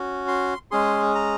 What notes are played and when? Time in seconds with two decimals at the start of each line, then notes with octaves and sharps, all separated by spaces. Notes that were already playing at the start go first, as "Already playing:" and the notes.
Already playing: C#4 F#4
0.28 C6
0.71 G#3 C#4 G#4 C6
1.15 A#5